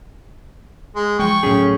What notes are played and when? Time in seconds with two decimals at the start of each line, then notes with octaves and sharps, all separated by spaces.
0.95 G#3
1.19 F3 G#3 G5 C#6
1.43 A2 F#3 C#4 G#4